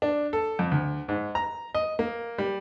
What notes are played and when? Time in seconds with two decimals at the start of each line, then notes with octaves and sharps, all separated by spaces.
0.02 D4
0.33 A4
0.59 F2
0.71 D2
1.08 G#2
1.35 A#5
1.75 D#5
1.99 A#3
2.38 G3